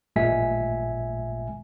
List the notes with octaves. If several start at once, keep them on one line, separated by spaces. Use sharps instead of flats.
A1 A#2 G#3 E5 G#5 B6